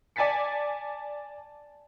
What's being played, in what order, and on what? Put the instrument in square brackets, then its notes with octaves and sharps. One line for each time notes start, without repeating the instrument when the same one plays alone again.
[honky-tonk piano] D5 G#5 A5 A6 B6 C#7